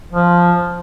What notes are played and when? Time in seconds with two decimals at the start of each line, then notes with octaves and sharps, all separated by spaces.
0.12 F3